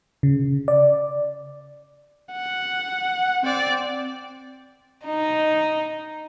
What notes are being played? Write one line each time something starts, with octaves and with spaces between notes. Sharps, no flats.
C#3
D5
F#5
C4 D5
D#4